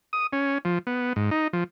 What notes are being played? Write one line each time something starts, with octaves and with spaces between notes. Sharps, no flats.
D#6
C#4
F3
B3
G#2
D#4
F3